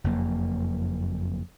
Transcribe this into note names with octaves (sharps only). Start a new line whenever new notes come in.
F#1 F2 A#3